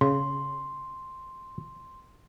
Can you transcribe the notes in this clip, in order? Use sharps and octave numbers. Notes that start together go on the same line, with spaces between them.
C#3 C6